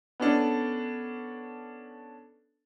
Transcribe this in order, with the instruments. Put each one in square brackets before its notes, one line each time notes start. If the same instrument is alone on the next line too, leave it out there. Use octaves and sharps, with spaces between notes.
[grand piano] B3 C#4 D4 A4